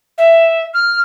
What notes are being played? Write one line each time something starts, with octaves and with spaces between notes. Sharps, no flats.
E5
F6